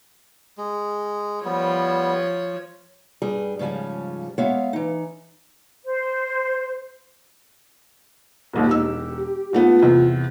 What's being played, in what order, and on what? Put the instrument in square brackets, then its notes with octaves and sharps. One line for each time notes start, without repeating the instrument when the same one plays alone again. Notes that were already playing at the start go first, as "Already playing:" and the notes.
[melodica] G#3
[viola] F3 C#5 [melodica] G3 B3
[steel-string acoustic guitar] G2 G3 G#4
G#2 C#3 F3 G3 C#4
G#3 B3 C#5 E5 F5
E3 D#4
[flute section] C5
[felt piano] E1 A#1 D#2
[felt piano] E1 D#4 E6 [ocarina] G4
[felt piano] G#2 A3 B3 [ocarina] F4
[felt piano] E2 C3